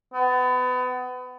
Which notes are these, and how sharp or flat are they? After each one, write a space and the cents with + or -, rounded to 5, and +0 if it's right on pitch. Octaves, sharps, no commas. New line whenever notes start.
B3 +30